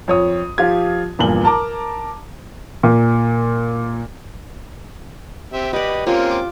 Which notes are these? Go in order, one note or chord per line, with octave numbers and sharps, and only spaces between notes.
F2 C#5 D#6
F3 F4 G4 G#6
E2 G2 A#2 F3 F#7 G7
A#4 A5 A#5 D6
A#2
C4 G4 E5
G4 B4 D5 D#5
A#3 C4 C#4 F4
D6